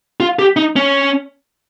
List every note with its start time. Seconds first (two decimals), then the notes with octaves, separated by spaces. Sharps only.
0.20 F4
0.39 G4
0.57 D#4
0.76 C#4